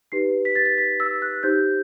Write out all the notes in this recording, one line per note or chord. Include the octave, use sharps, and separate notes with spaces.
D#4 G4 B4 C7
B6
A6
B6
B6
E6
F#6
D#4 G4 C5 G6